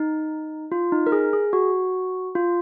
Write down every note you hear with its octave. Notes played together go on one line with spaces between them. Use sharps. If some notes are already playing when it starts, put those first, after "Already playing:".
Already playing: D#4
F4
D#4
A#4
G#4
G#4
F#4
F4